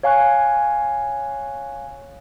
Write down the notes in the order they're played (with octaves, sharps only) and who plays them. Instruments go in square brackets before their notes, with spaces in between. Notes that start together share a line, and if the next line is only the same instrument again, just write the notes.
[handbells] C#5 F5 G#5 C#6 F#6